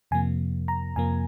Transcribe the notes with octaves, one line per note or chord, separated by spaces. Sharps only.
F2 C3 F3 A#3 G#5
A#5
F2 C3 F3 A#3 G#5